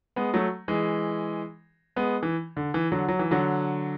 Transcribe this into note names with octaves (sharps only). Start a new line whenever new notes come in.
G#3 B3
F#3 A3
E3 G#3
G#3 B3
E3
D3
E3
D3 F#3
F#3
E3
D3 F#3